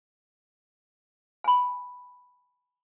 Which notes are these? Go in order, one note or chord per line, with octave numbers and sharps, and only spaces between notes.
G#5 B5